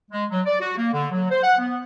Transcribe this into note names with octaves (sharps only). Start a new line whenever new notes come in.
G#3
F#3
D5
F#4
A#3
D3
F#3
C5
F#5
B3